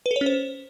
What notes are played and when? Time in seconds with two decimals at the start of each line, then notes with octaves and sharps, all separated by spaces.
0.06 B4
0.11 A4
0.16 C#5
0.21 C#4
0.26 C5